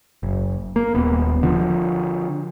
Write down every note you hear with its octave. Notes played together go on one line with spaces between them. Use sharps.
F#1
A#3
D#1 B3
D3 F3